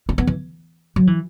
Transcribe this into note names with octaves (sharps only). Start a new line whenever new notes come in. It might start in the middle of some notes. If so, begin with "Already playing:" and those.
C#4
B3
E3
F#3
E3